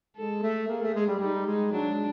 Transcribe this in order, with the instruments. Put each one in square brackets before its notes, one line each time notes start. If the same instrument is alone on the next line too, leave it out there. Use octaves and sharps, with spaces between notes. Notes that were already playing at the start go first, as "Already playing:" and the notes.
[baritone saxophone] G#3 [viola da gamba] A4
[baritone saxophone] A3
[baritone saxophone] A#3 [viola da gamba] G#4
[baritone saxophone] A3
G#3
G3
[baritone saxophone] G3 [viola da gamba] D#4
[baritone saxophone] G#3
[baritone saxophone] F#3 [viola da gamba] D4
[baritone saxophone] G#3